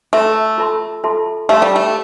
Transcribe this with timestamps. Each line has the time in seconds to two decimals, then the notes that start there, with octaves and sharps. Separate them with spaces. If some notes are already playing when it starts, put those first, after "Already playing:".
0.13 A3 F4 A4 E5 A5 C6
0.58 F4 A4 E5 A5 C6
1.04 F4 A4 E5 A5 C6
1.49 A3 G4 D5 F5 A5 C6
1.62 G3
1.76 A3